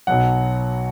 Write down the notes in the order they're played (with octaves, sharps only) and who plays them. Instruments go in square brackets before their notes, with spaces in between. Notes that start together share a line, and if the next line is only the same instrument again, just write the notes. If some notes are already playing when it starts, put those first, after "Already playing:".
[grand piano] B1 B2 F#3 F#5